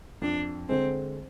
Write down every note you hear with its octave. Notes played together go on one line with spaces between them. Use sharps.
F2 D4
D3 G#3 C4